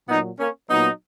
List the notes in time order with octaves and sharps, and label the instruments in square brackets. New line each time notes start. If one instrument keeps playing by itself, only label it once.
[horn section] A#2 F#3 B3 D#4
A#3 C#4
A#2 F#3 B3 D#4